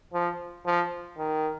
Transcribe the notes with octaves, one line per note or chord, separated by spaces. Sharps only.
F3
F3
D#3